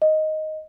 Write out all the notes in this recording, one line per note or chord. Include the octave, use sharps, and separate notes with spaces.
D#5